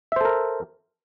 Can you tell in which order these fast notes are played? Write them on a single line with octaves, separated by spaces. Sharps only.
E5 C5 A4 A#4